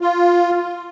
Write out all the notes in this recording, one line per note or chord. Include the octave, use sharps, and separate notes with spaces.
F4